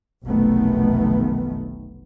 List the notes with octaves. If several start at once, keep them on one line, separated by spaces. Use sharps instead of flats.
F1 B1 D#3 A3 B3